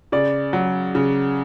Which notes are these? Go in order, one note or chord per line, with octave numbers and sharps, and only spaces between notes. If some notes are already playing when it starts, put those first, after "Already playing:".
C#3 D5
F#3
C#3